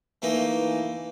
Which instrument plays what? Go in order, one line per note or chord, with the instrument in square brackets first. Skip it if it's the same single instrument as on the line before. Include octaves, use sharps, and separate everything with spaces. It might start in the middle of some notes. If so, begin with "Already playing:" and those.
[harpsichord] E3 A3 A#3 D#4